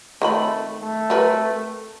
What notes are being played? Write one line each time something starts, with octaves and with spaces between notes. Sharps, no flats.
D#3 A3 C4 B5
A3
C4 A#4 B4